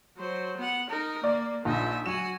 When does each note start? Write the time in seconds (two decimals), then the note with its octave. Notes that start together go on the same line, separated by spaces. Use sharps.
0.17 F#3 C5
0.57 B3 F#5
0.90 D#4 A#4
1.24 A#3 D5
1.65 A#1 D#4 E5
2.06 F#3 F#4 G#5 E7